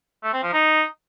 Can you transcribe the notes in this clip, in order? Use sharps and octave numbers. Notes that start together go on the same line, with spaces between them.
A3
C4
F3
D#4